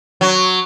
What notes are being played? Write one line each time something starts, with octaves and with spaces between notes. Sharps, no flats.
F#3